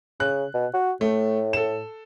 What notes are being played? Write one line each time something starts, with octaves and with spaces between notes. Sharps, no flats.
C#3 F#6
B2
F#4
A2 A3
A4 E7